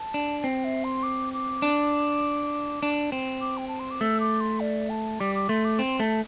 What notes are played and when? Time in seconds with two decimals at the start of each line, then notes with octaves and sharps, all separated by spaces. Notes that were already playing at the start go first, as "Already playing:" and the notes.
Already playing: A5
0.14 D4
0.44 C4 G5
0.64 E5
0.84 C6
1.03 D6
1.34 D6
1.62 D4
2.83 D4
3.12 C4
3.41 D6
3.58 G5
3.68 A5
3.79 C6
3.91 D6
4.01 A3 E6
4.20 D6
4.40 C6
4.60 D5
4.90 A5
5.20 G3 D6
5.35 D6
5.49 A3 C6
5.65 D6
5.79 C4 C6
6.00 A3 A5